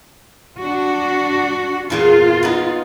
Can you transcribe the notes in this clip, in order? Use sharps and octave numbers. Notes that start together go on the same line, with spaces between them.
D4 F#4
E2 A#2 F4 G#4
B3 D#4